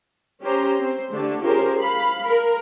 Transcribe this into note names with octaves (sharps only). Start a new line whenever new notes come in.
C#4 G4 C5 A#5
C4 C5
D3 A3 D4 G4
C#4 F4 G4 G#4 A#4 C5
F5 B5
A#4